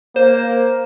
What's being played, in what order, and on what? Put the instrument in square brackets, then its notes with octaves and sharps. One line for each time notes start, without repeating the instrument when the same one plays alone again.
[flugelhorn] A#3 [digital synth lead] C5